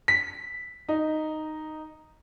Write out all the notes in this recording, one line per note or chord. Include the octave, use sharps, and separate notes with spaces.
B6
D#4